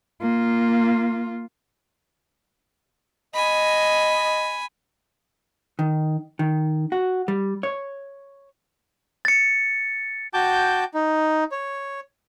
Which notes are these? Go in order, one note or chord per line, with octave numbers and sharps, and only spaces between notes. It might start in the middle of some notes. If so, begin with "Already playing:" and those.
A#3 F4
D#5 G#5 B5
D#3
D#3
F#4
G3
C#5
A6 C#7
F#4 G5 A5 D6 G6
D#4
C#5